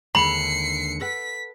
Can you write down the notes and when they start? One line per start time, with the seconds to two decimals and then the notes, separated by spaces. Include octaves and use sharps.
0.15 D#2 D3 G#3 B5 C7 C#7 F#7
1.01 A4 B4 F#5 B6